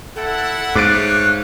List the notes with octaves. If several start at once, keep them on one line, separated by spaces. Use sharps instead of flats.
E4 A4 F#5
G#2 A3 C#5 F5 D6 F#6 A6 D7